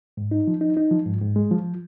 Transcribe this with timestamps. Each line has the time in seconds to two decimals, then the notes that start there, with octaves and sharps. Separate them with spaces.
0.17 G#2
0.31 D#4
0.47 F3
0.61 D#4
0.77 D#4
0.91 F3
1.06 G#2
1.21 G#2
1.36 G#3
1.51 F3